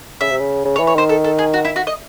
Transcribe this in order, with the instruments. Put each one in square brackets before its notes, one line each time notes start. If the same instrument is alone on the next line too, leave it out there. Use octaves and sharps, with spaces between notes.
[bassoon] C#3 [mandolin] E5
[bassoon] C3
C#3
C#3
[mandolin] C#5
[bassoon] E3
[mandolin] C#5
[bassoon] D#3 [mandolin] C5
[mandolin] A4
A4
G#4
F#4
E4
F#4
D#5